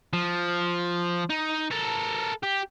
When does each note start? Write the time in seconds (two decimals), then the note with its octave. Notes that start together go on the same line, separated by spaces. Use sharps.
0.13 F3
1.30 D#4
1.71 A4 A#4
2.43 G4